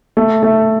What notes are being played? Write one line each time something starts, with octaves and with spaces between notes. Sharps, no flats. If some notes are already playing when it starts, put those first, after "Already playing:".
A3
A3